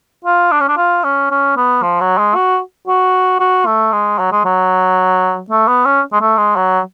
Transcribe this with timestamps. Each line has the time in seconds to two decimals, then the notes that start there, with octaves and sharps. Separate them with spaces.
0.25 F4
0.52 D4
0.61 C#4
0.68 D4
0.77 F4
1.04 C#4
1.31 C#4
1.57 B3
1.83 F3
2.01 F#3
2.18 G#3
2.35 F#4
2.88 F#4
3.40 F#4
3.66 A3
3.93 G#3
4.19 F#3
4.32 G#3
4.45 F#3
5.50 A3
5.68 B3
5.85 C#4
6.12 G#3
6.21 A3
6.38 G#3
6.56 F#3